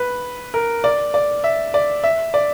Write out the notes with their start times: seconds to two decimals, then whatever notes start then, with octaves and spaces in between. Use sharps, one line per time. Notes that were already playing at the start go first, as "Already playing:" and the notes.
Already playing: B4
0.54 A#4
0.84 D5
1.14 D5
1.44 E5
1.74 D5
2.04 E5
2.34 D5